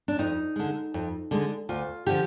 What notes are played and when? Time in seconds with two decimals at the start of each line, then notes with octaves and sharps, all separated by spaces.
0.08 D4
0.19 F2 D#4
0.56 D3 G#3
0.94 F2
1.31 D3 G#3
1.69 D2 F4
2.06 D3 F3 G4